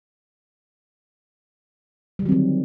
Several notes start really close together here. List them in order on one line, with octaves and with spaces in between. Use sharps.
G3 D3 F#3 C4 D#3